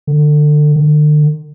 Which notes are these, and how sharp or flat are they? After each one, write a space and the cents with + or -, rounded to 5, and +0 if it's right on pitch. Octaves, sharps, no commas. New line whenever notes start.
D3 +25
D3 +40